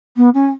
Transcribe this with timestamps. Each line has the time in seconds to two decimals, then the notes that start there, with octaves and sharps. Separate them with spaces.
0.16 B3
0.34 C#4